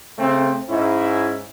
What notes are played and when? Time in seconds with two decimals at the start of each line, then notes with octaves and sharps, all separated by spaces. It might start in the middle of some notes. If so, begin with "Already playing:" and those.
0.19 C#3 A3 C4
0.69 G#2 C#4 E4